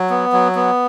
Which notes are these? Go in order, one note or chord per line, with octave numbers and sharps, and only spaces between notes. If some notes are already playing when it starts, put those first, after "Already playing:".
Already playing: F#3
B3
F#3
B3